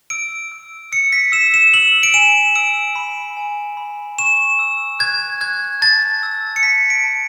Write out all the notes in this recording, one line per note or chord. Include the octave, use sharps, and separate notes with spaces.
E6 D7
E6
E6 C#7
B6
E6 E7
E7
E6 F#7
D7
G#5 E7
E6 D7
B5
G#5
B5
C#6 E7
E6
F#6 G#6
F#6 G#6
A5 A6
E6
C#7
A5 B6
D7
A5